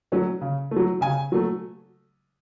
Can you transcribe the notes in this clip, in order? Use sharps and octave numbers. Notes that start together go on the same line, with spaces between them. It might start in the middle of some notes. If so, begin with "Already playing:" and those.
F#3 A3 C#4
C#3
F#3 A3
C#3 G#5
F#3 A3